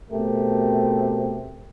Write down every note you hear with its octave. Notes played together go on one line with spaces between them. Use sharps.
B2 A3 C4 G4 A#4